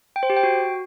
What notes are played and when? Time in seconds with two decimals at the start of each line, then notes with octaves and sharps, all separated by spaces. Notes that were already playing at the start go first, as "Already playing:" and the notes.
0.16 G5
0.23 C5
0.30 G4
0.36 G5
0.43 F#4